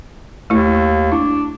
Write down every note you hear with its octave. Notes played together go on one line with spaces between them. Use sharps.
D#2 A3 E4
D4 E4